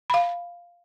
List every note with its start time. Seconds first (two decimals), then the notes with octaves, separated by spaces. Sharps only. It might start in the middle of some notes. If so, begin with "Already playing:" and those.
0.10 F5 B5